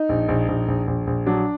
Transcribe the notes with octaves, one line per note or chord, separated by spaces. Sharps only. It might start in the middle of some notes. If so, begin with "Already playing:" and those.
Already playing: D#4
A#1
A#1
A#1
A#1
A#1
A#1
F#3 D4